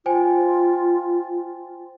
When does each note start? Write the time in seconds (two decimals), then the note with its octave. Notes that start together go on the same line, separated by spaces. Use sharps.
0.06 F4 C5 G5 G#5